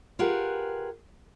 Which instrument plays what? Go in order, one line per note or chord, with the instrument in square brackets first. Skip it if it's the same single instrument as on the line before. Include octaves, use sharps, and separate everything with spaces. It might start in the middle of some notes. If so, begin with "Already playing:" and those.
[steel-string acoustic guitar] F4 G4 G#4 A#4 B4 F#5